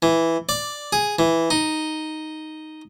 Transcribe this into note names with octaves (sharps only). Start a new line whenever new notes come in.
E3
D5
G#4
E3
D#4